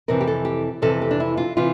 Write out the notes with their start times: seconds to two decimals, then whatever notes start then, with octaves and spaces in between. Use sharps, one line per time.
0.08 F2 C3 E3 A#4
0.21 G4
0.27 A4
0.45 G4
0.82 F2 C3 E3 A4
1.02 G4
1.11 D4
1.20 E4
1.37 F4
1.57 C3 E3 F4